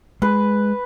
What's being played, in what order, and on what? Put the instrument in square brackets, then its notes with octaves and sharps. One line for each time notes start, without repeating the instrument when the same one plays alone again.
[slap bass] G#3 [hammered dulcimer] B4